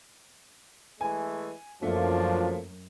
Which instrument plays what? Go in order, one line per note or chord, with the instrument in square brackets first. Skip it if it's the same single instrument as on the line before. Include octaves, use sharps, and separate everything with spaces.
[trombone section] E3 G#3 A3 [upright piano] G#5
[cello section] F#2 [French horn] F3 [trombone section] F#3 D4 F4 [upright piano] A3 A#3